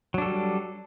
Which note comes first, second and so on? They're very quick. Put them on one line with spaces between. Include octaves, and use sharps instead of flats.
F#3 D4 A4 G3